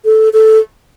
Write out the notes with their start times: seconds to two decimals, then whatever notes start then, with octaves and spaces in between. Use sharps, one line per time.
0.05 A4
0.33 A4